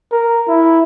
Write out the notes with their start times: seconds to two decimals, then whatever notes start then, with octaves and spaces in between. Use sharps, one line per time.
0.12 A#4
0.48 E4